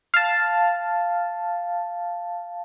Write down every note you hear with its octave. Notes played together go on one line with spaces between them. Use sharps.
F5 A5